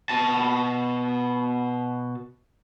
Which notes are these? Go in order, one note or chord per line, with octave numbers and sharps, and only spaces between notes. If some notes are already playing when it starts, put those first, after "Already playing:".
B2 A5